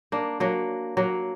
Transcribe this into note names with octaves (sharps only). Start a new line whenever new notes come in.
A#3 D4
F#3 A#3
F#3 A#3